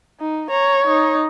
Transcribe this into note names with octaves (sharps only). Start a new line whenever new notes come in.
D#4
C#5 A#5
D#4